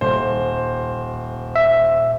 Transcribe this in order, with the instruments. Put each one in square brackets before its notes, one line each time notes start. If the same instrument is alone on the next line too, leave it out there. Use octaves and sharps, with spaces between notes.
[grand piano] D#1 C5
[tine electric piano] E5